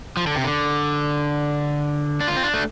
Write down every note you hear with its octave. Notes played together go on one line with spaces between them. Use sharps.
F3
D3
C3
D3
D4
F4
C4
D4
A3